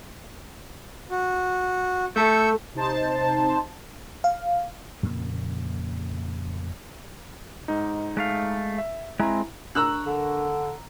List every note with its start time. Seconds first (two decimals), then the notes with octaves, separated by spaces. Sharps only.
1.11 F#4
2.16 A3 A4 C#6 E6 G6
2.74 C3 D#4 C5 A5
4.24 F5
5.03 F2 A#2 C#3 A#3
7.68 G#2 D#4
8.17 G#3 A3 F5
8.78 E5
9.20 G#3 C4 E4 G#5 A#5
9.75 D4 A#4 A#5 C#6 E6 F#6
10.06 D3